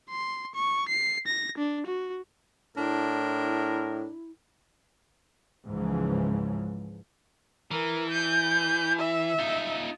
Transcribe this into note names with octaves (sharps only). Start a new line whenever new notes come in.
C6
C#6
C7
A#6
D4
F#4
A2 D4 E4 A#4
C#2 G#2 C#3 E3 F3
E3 A#4
G6
E5
D#4 F4